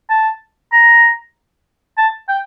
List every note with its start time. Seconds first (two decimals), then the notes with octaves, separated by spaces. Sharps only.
0.10 A5
0.72 A#5
1.97 A5
2.28 G5